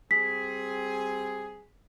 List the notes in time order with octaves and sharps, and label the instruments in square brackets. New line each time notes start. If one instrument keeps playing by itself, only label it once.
[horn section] G3 C4 G#4 [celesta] B6